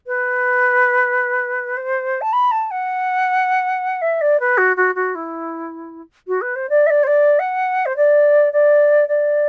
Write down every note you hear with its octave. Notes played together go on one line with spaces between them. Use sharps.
B4
C5
A5
B5
A5
F#5
E5
D5
B4
F#4
F#4
F#4
E4
F#4
B4
C5
D5
E5
D5
C5
D5
F#5
C5
D5
D5
D5